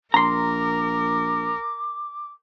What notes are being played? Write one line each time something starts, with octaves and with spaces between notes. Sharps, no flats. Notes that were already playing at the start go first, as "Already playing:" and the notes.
A#1 A#4 A#5 C6 D6